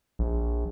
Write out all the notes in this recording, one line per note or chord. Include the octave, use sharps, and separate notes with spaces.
A#1